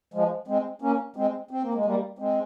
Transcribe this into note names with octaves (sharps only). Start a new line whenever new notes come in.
F3 G#3
G#3 C4
A#3 C#4
G#3 C4
C4
A#3
G#3
G3 A#3
G#3 C4